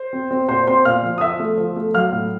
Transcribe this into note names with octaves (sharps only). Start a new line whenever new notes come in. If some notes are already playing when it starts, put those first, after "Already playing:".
Already playing: C5
C4
C4
A#2 C5 C6
C4 C5 C6
A#2 F5 F6
F3
D#6
F3 E5 E6
A3
F3
A3
F#3 F5 F6
A2